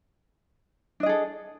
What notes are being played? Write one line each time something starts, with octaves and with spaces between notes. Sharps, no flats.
D4 G#4 A4 D#5